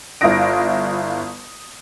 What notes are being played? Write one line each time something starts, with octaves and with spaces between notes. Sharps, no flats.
G1 E4 F4 D#6 A#6 D7